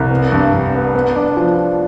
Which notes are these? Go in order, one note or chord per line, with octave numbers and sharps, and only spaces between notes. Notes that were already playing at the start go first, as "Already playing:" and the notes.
Already playing: C2
B3
G2
G2
B3
B3
D4
F3